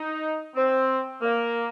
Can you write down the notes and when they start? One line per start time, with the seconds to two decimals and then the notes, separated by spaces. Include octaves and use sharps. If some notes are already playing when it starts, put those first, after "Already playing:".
Already playing: D#4
0.55 C4
1.21 A#3